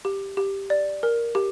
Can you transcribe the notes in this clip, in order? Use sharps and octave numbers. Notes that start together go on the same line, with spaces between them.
G4
G4
D5
A#4
G4